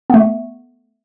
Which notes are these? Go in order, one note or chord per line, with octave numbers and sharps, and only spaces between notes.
A3 B3